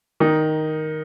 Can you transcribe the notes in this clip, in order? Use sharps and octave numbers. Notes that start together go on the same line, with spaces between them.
D#3 D#4